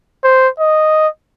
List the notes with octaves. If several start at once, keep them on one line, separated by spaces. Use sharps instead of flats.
C5
D#5